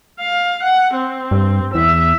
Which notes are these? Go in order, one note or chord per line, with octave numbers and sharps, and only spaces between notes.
F5
F#5
C4
G2
E2 E5